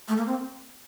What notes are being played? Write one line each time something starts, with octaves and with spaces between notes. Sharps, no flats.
A3
A#3
C4